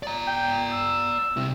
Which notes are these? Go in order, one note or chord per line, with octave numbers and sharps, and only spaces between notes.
D5 A#5
G5
E6
C3 E4